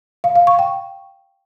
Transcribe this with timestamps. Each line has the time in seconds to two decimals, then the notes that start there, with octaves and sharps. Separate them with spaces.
0.24 F5
0.36 F5
0.47 C#6
0.59 G5